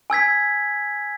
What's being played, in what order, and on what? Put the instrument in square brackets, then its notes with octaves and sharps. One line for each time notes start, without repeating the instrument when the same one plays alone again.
[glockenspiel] G#5 E6 G#6 B6